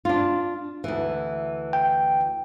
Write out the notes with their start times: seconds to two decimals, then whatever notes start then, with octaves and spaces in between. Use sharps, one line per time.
0.05 D4 F4
0.84 D2 E3
1.73 G5